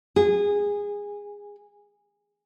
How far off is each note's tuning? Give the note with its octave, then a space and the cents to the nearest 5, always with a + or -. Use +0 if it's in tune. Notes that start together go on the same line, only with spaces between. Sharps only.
G#4 -20